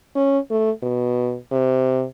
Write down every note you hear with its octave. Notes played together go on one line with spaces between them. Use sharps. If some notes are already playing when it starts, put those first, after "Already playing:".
C#4
A3
B2
C3